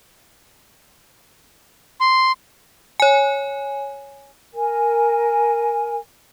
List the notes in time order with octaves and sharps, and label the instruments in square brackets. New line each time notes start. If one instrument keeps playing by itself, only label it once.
[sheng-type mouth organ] C6
[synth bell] C#5 G#5
[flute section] A#4 G#5